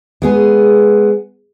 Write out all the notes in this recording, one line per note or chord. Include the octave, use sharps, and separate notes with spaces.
G#3 B3 G#4